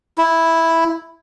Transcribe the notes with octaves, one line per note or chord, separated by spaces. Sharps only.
E4